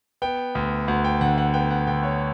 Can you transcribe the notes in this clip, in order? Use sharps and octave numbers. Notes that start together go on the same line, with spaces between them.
B3 G5
D2
D2 F#5
G5
D3 F#5
F#5
B3 G5
F#5
D3 G5
C#5